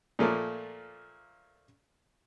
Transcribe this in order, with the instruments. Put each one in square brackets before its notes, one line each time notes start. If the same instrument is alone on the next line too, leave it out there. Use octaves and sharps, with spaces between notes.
[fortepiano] A#2 F3 A3 A#3